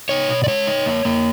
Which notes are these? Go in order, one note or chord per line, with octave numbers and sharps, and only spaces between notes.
D#4 C#5
B2
D5
G#3 C#5
D#4
A#3
A#3